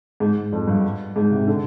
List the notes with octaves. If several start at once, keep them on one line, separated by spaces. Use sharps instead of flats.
G#2
F2
G2
G#2
C3
D3